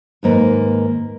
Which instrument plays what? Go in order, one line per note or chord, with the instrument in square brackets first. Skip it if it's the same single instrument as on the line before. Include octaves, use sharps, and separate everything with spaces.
[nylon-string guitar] D#2 G#2 A#3 B4